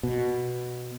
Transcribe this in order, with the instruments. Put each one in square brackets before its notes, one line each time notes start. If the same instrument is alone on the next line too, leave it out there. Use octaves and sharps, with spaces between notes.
[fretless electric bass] B2